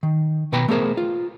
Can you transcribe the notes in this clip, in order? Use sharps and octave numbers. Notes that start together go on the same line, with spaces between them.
D#3
B2 B4 G5 A#5 B5
A3 B3 G#4 A#4 C5
F4